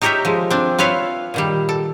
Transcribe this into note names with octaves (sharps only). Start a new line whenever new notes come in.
D#4 G4 A#4 C#5 D#5 E5
F3 G#3
C4 D4
F4 B4 C#5 E5 F5
A#2 D#3 G3
A4